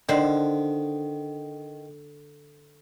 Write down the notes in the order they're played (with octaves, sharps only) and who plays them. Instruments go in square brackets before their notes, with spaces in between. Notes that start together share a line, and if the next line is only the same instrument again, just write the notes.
[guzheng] D3 C5 [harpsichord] D#3